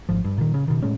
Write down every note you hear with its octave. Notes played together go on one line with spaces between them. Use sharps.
G#1 F3
G2
A#2 D#3
C#3
B2 D#3
A2 G#3 C#4